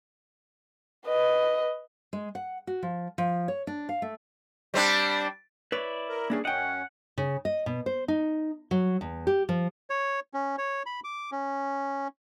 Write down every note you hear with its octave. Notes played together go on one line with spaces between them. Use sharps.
B4 D#5
G#3
F#5
F#4
F3
F3
C#5
D4
F5
A3
G3 C4 D4
E4 B4 C#5 D5
A#4
E3 G3 A#3 C#4 D4 G#4
F#2 C#4 D#5 F#5 G5
C#3
D#5
B2
C5
D#4
F#3
E2
G4
F3
C#5
C#4
C#5
B5
D6
C#4